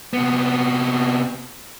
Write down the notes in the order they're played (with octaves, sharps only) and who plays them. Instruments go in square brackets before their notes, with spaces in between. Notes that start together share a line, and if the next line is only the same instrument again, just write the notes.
[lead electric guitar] C3 B3